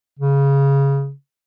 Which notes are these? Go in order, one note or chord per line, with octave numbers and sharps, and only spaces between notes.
C#3